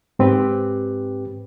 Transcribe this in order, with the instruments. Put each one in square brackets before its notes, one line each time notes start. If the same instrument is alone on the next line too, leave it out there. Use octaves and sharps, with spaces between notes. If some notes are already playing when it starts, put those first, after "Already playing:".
[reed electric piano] G#2 C4 G4 B4